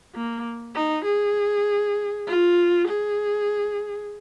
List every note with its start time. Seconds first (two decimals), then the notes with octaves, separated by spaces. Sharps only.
0.15 A#3
0.75 D#4
1.05 G#4
2.27 F4
2.88 G#4